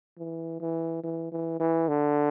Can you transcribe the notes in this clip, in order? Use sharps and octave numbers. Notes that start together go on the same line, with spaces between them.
E3
E3
E3
E3
E3
D3